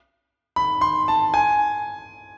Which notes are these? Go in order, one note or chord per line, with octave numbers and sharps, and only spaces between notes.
B5
C6
A5
G#5